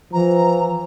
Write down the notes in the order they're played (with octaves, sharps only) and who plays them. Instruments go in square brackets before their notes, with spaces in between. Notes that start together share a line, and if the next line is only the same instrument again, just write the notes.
[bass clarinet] E3 [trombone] F3 [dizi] A#5